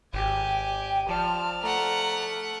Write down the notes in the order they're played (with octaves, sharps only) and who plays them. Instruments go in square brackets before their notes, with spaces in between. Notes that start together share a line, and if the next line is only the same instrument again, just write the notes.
[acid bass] G#1 [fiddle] G4 G#5
[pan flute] G5
[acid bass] F3 [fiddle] D5 F6 [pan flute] A5
[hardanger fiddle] A3 F#5 [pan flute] A#5